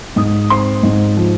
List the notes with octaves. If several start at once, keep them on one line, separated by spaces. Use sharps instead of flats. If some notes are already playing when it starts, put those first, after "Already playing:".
G#2 D#6
C4 C6
G#2
F3